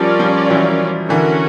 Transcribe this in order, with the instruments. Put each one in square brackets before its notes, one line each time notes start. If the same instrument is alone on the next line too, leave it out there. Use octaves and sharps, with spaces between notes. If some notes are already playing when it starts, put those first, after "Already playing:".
Already playing: [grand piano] F3 G3 [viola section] C#4 F4 A#4 D5
[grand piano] F3 G3
E3 F#3
[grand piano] D3 E3 [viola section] C#4 F#4 A#4